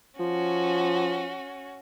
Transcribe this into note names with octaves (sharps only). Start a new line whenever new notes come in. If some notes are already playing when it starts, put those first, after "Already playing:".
F3 C#4 F#4